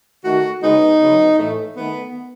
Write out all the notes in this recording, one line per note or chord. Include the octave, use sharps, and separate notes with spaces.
D#3 A3 F#4
C#3 G#3 B3 D#4
C#3 F#3 B3
A2 E3 A3
D#3 A3 B3